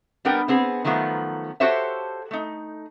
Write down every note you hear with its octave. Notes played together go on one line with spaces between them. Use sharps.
G3 B3 D4 A#4 G5
B3 C4 G#4
D#3 F3 F#3 A3 B3
F#4 G4 A4 C5 C#5 E5
A3 D#4